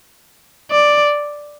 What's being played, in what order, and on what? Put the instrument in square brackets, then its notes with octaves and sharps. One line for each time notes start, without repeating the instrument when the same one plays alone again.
[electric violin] D5